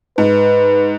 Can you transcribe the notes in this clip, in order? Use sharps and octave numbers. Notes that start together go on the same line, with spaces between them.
G#2 B4